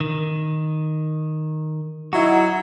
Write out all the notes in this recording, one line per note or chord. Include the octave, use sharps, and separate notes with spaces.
D#3
F#3 D#4 E4 F#4